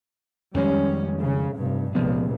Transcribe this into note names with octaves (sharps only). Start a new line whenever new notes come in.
F2 D#3 G3 G#3 C#4
C#3
F1 G2
F1 C#2 A#2 F3 B3